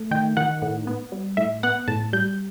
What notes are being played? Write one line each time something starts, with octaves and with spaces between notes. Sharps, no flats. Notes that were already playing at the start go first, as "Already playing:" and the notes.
Already playing: A3
D#3 G5
D#3 F#5
A2
B3
G3
A2 E5
B3 F#5
A2 A5
G3 G6